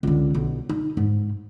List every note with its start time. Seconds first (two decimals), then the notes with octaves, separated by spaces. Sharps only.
0.03 C#2 D3
0.34 B1
0.69 D#4
0.97 G#2